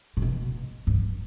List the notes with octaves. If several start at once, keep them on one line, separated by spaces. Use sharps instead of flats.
A#2
B2
G2